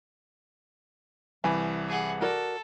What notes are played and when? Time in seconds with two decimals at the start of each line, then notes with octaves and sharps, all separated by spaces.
1.44 C2 E3 G#5 B5
1.88 G#4 F#5
2.21 F#4 A4 A#4 D5